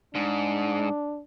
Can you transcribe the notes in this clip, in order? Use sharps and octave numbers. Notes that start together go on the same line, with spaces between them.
G#2 D4